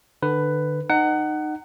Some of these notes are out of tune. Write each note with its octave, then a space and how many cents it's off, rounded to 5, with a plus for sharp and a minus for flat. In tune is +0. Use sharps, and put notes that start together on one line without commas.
D3 +30 B4 +10
D#4 -25 F#5 +20